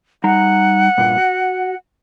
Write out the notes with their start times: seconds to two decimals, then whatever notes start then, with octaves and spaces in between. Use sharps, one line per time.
0.24 G3 D#4 F#5 A#5
0.98 G2 A#2 F4
1.18 F#4